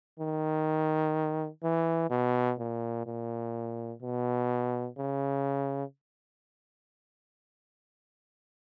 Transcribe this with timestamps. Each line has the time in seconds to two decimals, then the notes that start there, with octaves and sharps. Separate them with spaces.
0.19 D#3
1.63 E3
2.10 B2
2.59 A#2
3.06 A#2
4.02 B2
4.97 C#3